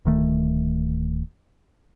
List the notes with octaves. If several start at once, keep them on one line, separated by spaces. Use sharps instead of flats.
D1 D#3 A3